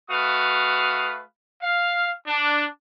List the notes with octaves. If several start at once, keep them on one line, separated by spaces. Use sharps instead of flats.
A3 F#4 B4 F5 D#6
F5
D4